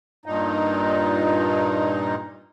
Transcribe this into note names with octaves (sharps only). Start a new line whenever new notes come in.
G2 A#2 D#4